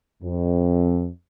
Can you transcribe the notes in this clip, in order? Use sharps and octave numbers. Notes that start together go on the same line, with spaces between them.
F2